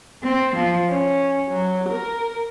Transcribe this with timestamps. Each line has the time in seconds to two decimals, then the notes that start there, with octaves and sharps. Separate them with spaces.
0.23 C4
0.55 F3
0.89 C#4
1.49 F#3
1.89 A#4